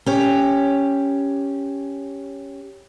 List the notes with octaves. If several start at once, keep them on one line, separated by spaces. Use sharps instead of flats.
C#4 G4 C#5